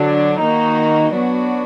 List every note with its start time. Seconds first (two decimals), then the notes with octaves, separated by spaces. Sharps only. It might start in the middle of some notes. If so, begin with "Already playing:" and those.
Already playing: D3 F#3 D4
0.41 D#3 A#3 D#4 F#4
1.13 F#3 B3 D4 F#4